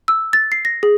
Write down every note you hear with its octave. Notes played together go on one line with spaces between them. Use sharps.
E6
A6
C7
A#6
G#4